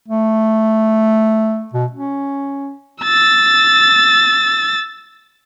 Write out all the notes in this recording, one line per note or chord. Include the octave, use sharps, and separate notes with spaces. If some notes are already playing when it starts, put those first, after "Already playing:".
A3
B2
C#4
E6 A6